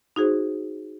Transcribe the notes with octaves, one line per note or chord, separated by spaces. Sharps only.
D#4 F#4 G#4 C5